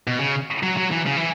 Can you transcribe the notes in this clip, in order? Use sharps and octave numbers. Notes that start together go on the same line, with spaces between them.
B2
C#3
F#3
F#3
E3
C#3
E3